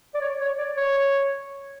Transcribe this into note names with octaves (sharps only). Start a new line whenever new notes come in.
D5
C#5
C#5
D5
C#5